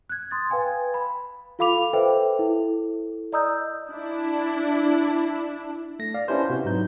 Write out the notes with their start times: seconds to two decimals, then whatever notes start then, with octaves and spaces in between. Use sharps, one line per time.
0.10 F#6 G#6
0.31 C6 D#6 A6
0.50 B4 F5 G5 G#5 G#6
0.94 B5
1.59 F4 A4 F5 B5 D6 F7
1.93 A4 B4 C5 E5 G5
2.39 E4 A4
3.33 D5 D#5 A#5 D#6 E6 G6
3.90 D4 E4
5.99 A3 A#6
6.14 D5 F5
6.28 C#4 D4 E4 G4 B4 C5
6.49 C3 F#4 B4
6.64 G#2 F#3 D#4 G6